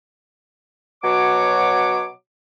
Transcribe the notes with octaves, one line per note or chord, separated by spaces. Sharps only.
B2 F#3 C#5 D6